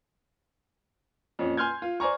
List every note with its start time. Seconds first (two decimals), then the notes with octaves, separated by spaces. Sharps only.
1.39 F2 A#2 C#4
1.57 G#5 C6 F6 G6 G#6
1.82 F4
2.00 C5 D5 G#5 A#5 C#6